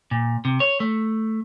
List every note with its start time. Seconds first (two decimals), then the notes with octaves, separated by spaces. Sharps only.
0.11 A#2
0.45 C3
0.60 C#5
0.80 A3